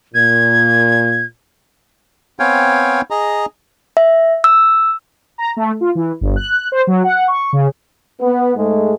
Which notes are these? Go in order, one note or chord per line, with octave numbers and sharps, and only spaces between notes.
A#2 G#6
B3 C4 C#5 F5 G5 G#5
G#4 D#5 A#5
E5
E6
A#5
A3
F4
E3
G1
F#6
C5
F#3
F#5
C#6
C#3
B3
G#2 G#3 A3